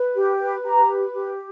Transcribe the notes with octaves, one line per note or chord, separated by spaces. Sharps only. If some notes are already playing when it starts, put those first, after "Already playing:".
Already playing: B4
G4
B4
G4 A#5
B4
G4